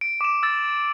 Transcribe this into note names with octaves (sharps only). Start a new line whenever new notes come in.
D7
D6 E7
E6 A6